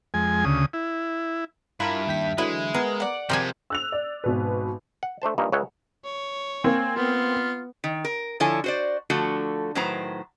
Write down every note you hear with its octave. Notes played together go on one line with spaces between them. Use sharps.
F2 G#3 G#5
D2 C#3 D#6
E4
G2 E4 F4 A#4 B5
D#2 G5 B6
D3 E3 F#3 G#3 E4 B4
B3 G#4 A#4
D5 F#5
C3 F3 G3 G#3 G4 A#4 C5 G#5
E6 F#6 F7
D5
G#1 B2 B4
F#5
A3 D4 C5 A5
G2 A#2 A#3 D#4
C#2 C#3 C#5 E5 F#5
C#5
A#3 C4 G#5
B3 F4
D#3
A#4
D3 F3 E4 A4 C#5 G#5
F#4 C5 D5
D3 F3 A3 F#4 A4
A2 D#3 F#3 B4 C5 A#5